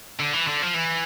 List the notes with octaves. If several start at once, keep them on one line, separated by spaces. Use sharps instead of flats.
D3
E3
D3
F3
E3